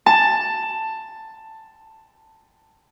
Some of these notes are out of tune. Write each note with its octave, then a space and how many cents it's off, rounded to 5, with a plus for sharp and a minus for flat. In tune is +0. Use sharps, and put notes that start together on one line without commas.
A5 +10